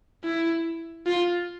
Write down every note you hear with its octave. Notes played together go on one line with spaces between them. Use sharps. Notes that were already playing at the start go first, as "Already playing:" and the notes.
E4
F4